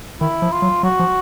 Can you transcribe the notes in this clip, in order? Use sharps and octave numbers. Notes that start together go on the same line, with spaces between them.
D#3 E4
F3
F4
F#3
F#3 F#4
F3